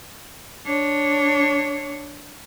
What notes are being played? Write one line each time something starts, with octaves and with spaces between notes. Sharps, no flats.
D4 C#5